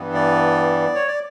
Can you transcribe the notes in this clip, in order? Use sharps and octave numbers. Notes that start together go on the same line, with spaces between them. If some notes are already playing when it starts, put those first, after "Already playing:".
Already playing: G2 E3 B3
D5
C#5
D5